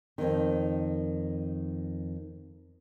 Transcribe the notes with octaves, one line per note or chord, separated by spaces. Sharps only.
F2 D#3